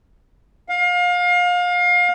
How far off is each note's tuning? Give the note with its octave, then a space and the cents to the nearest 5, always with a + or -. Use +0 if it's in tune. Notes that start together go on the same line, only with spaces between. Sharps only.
F5 +30